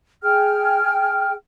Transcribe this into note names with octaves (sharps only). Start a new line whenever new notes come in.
G#4 G5 F6